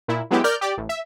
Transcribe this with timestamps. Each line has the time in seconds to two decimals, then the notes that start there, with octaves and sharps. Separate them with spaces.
0.08 A#2 E4
0.31 F#3 G#3 B3 E4 G4
0.44 A#4 D5 F6 G6
0.61 G4 D5
0.77 A1
0.89 E5